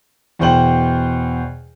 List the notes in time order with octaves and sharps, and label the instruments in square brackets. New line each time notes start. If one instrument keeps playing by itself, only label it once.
[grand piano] E2 B2 C5 G5 F#7